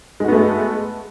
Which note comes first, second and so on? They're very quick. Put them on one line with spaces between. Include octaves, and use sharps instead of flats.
G#3 F#4 B3 A3